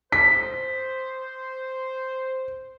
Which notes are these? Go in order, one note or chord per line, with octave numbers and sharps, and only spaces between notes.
C5 B6